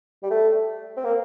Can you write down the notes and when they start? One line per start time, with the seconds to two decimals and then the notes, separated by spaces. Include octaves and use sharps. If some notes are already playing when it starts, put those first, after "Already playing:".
0.23 G3
0.31 A3
0.97 C4
1.05 A#3